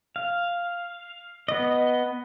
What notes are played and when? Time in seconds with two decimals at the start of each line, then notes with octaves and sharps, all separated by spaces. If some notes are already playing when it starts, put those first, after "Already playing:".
0.16 F5
1.48 B3 D#5